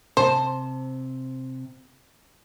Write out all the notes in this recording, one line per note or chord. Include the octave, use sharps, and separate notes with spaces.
C3 C5 A5